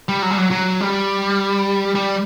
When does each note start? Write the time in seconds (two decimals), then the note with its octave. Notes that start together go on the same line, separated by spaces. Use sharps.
0.09 G3
0.22 F#3
0.31 G3
0.38 F#3
0.51 F#3
0.80 G3
1.95 G3